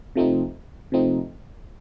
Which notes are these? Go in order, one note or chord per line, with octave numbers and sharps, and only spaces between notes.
C3 F3 A3 C4 D#4
C3 F3 A3 C4 D#4